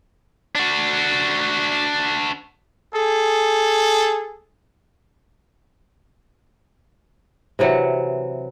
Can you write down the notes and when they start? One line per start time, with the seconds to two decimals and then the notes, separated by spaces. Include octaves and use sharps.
0.55 D4 F#4
2.93 G#4 A4
7.59 C3 E3 F#3 F#5